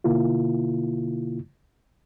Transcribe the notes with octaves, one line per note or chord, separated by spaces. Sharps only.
B2 D3 A#3 E4 F4